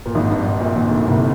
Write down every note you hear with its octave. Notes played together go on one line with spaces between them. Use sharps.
A#2
G#1 G#2
G2
G2
A#1 A#2
D#2 D#3
D2 D3
C2 C3